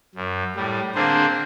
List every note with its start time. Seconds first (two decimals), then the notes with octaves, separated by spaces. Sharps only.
0.15 F#2
0.56 A2 G3
0.95 D3 A#3 C4 D4 G#4 C5